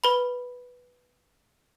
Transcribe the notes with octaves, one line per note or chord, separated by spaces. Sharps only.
B4 B5